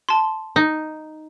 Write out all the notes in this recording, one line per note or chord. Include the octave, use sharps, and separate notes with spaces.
A5 C6
D#4